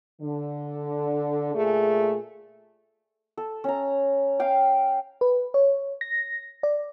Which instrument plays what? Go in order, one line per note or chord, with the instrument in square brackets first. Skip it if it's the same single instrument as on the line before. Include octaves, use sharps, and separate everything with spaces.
[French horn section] D3
A#2 A3 G#4
[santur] A4
C#4 A#5
F5 G5
[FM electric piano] B4
C#5
A#6
D5